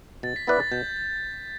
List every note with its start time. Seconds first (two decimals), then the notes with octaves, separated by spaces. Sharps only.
0.23 B2 A6
0.36 B6
0.47 B3 E4 B4 D5 A6
0.60 A6
0.72 B2 G6